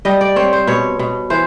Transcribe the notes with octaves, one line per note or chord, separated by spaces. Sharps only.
G3 D#5
D5
C4 C#5
C5
B2 C#5
B2
E3 C5